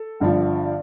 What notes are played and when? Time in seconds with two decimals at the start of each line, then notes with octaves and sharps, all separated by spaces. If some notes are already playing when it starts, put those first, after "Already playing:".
Already playing: A4
0.20 G1 G2 D3 F3